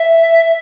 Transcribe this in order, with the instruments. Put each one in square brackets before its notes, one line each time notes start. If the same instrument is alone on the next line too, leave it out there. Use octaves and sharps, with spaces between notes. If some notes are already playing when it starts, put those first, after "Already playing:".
Already playing: [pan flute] E5